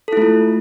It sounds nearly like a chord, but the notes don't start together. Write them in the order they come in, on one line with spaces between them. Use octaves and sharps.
A4 E4 A3 F4